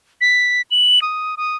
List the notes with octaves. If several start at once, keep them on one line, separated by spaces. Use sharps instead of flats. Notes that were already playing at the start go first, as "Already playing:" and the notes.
B6
F#7
D#6
D#6